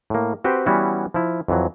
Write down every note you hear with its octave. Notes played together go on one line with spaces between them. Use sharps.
A2 A#3
C4 F#4 G4 B4 C5 G5
E3 G3 B3 C#4 E4 F#4
F3 E4
F2 E3 F#3